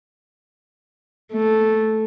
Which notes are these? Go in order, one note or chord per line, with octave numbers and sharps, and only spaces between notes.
A3